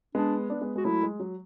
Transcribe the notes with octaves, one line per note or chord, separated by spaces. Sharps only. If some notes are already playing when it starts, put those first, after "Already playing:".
G#3 B3 D4
B3 D4
G#3 B3
G#3 F#4
F#3 A3 E4
G#3
F#3